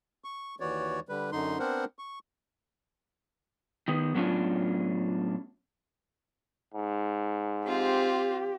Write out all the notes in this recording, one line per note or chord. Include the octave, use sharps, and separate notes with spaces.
C#6
D#2 E3 F#4 C#5 D5
D3 G3 B4
F#2 D3 D#4 C6
B3 C4 D4 A#4 C5 F#5
C#6
D#3 B3
A2 F#3 B3 C#4 D4 F4
G#2
C4 F4 G4